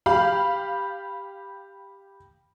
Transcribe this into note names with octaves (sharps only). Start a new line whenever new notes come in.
G4 F5 B5